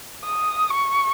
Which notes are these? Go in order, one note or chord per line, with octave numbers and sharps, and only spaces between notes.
D#6
C#6